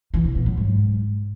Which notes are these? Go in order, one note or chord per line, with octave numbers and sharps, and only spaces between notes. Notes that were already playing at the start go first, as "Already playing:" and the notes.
E3
C3
B2
F#3
G#2